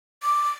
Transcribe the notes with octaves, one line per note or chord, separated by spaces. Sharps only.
D6